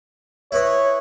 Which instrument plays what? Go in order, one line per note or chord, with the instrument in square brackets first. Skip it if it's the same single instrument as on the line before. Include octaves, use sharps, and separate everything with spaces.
[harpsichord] E4 B4 D#5 [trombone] C#5